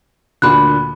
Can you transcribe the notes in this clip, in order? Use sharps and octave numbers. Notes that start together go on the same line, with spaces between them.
D2 A#2 D3 B5 F#6